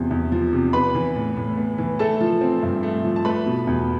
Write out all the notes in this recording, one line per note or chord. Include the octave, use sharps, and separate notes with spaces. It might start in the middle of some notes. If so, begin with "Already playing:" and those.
Already playing: E2 C3 F3
E2
F3
C3
B3 B4 B5
E3
A2
A2
B3
E3
A3 A4 A5
F3
C4
G2
A3
F3
A5
A3 B4 B5
B2
E2